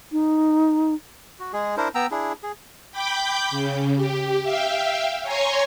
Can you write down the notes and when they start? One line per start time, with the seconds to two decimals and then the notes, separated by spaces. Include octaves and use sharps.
0.12 D#4
1.40 F#4
1.53 G#3 G#4
1.77 D4 E4 A#4 C5
1.95 B3 G5 A#5 E6
2.11 D4 E4 G#4
2.43 G#4
2.92 G5 B5 D6 G6
3.51 C#3
3.96 G4
4.42 E5 F5 G5
5.23 C#5 G#5 A#5 C6 C#6